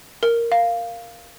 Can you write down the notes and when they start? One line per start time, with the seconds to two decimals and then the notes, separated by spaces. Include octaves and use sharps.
0.23 A#4
0.52 F5